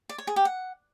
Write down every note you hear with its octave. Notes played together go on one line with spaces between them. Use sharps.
D5
C#5
G#4
G4
F#5